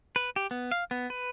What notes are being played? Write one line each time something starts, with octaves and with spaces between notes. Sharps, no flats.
B4
G4
B3
F5
B3
B4